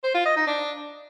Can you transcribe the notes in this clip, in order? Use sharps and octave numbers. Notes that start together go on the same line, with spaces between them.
C5
F4
D#5
D#4
D4